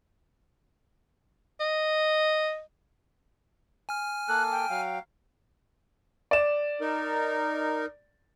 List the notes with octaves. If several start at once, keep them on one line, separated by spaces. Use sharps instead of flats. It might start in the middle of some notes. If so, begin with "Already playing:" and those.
D#5
G#5 F6
A#3 A4 F#6
G5
F#3 F5
D5 E7
D#4 A#4